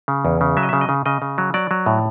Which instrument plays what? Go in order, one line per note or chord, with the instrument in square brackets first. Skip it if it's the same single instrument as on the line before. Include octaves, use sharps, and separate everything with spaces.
[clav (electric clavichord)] C#3
E2
C#3
F#3 E5
D#5
C#3 E5
D#5
C#3
C#3 D#5
C#3
F#3
F#3 D5
F#3
A2